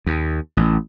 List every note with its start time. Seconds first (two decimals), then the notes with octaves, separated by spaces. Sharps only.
0.06 D#2
0.57 A1